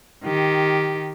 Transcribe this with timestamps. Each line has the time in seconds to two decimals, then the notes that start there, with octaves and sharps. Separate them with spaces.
0.25 D#3 G4